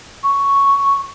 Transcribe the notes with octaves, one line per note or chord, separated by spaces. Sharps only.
C#6